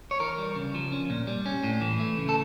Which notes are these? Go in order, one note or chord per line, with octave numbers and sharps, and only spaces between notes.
C#5
E3 A#4
G3
C#3
F3
C#4
A#2
G3
C#4
A2
E3
A3
C#3
A4